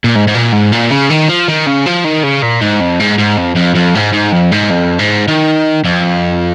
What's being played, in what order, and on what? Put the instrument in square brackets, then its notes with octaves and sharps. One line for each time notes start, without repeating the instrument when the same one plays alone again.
[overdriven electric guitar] A#2
G#2
G#2
A#2
G#2
A#2
C#3
D#3
F3
D#3
C#3
F3
D#3
C#3
A#2
G#2
F2
G#2
G#2
F2
F2
F2
G#2
G#2
F2
G#2
F2
G#2
D#3
F2